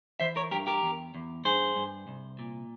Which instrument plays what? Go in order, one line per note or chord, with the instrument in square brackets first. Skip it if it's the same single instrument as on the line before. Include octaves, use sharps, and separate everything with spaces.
[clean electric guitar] E3 C5 E5
A#4 C#5
G2 G4 A#4
G4 A#4
E2
E2
G2 G#4 C5
G2
C2
A#2